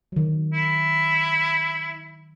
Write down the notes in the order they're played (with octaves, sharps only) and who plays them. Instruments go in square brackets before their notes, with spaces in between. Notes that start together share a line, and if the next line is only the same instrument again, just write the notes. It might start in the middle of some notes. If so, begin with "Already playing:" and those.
[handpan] D#3 F#3
[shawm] E4